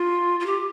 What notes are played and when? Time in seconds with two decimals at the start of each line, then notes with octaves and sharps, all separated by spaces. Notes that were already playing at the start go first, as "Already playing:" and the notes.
Already playing: F4
0.39 F4
0.45 G4